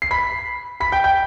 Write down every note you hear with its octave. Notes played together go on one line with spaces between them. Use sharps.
C7
B5 B6
B5 B6
G5 G6
G5 G6